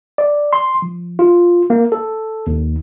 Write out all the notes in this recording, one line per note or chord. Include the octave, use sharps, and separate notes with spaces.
D5
C6
F3
F4
A#3
A4
D#2